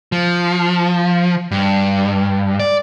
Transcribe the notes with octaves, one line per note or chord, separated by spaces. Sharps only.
F3
G2
D5